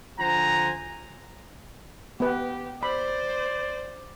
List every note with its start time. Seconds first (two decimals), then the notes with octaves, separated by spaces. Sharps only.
0.19 D3 F3 C5 F#5 G#5 A#5
2.20 B3 G4 B4
2.83 C5 D5 B5